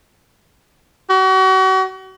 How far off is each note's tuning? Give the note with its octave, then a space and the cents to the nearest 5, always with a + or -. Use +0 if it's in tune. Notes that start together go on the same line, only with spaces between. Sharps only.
F#4 +35